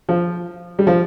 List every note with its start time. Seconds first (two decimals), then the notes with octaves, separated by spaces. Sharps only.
0.09 F3
0.79 G3
0.87 F3